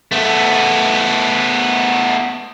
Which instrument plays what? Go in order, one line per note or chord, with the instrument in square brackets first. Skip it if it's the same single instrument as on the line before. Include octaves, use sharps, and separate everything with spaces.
[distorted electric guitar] A3 B3